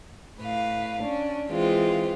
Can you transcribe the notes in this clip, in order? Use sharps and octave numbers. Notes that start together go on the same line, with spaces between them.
A2 B4 F5
C#4 D4
E3 G#3 C4 F4